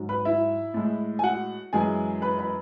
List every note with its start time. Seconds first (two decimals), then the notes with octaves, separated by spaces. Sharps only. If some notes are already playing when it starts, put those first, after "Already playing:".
Already playing: G#2 F#3
0.09 B4 B5
0.25 E4 E5
0.74 A2 G#3
1.19 G#5
1.23 F#4 F#5
1.73 F#2 E3 G#3 G#4 G#5
2.22 B4 B5
2.38 B4 B5